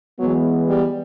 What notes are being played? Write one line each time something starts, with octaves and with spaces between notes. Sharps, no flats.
E3 F#3 G#3 B3
G3